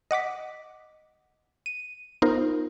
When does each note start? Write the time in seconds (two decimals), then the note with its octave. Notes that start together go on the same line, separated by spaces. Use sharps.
0.11 D#5 F#5 D6 B6
1.66 D#7
2.22 B3 D#4 F4 A#4 C5